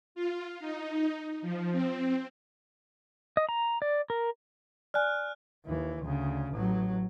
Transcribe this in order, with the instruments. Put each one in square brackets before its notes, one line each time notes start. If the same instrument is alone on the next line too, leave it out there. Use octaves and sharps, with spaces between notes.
[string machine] F4
D#4
F3
C4
[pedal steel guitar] D#5
A#5
D5
A#4
[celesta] D5 G#5 [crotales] F6 F#6
[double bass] D#2 E3
D2 C#3
A1 F#3